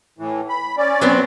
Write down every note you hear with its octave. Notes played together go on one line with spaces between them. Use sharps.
A2 E3
B5
C#4 D5
F#3 B3 C4